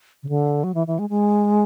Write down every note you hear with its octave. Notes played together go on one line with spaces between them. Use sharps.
C#3
D3
F#3
E3
E3
G#3
G#3